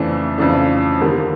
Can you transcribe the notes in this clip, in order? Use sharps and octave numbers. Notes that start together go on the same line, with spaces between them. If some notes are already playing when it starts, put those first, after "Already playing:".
Already playing: F2 C#3 E3 A3 D4
F2 C#3 E3 A3 D4
D#2 D3 G3 A#3